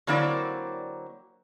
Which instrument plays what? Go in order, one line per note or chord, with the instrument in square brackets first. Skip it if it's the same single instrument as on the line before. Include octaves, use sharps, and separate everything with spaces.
[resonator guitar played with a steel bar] D3 F#3 A#3 C4 E4 D5